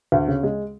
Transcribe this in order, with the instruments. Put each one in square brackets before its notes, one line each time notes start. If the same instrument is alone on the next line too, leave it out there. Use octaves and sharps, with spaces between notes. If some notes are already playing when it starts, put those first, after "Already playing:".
[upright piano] D2
C#3
G#3